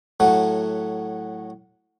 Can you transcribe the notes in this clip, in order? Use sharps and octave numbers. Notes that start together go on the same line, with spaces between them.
A2 F#3 A3 F#4